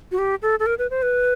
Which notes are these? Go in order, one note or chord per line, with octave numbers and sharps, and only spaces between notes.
F#4
G4
A4
A4
A#4
B4
C5
B4